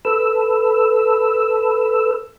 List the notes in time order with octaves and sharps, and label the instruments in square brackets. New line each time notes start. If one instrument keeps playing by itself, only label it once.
[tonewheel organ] A4 B4 E6